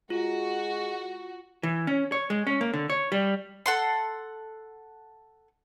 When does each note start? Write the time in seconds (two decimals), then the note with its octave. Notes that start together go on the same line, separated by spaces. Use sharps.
0.10 G#3 F4 F#4
1.63 E3
1.87 C#4
2.12 C#5
2.30 G#3
2.47 C#4
2.61 A#3
2.74 D3
2.90 C#5
3.12 G3
3.66 A4 F#5 C6